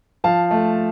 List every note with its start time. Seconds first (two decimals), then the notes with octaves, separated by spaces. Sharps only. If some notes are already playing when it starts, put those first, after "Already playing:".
0.24 F3 F5 A5
0.51 A3